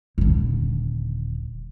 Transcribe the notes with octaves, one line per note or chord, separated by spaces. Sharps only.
D#1 D3